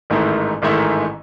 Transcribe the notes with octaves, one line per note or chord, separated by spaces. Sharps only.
A1 G#2 D#3 A3 E4
A1 G#2 D#3 A3 E4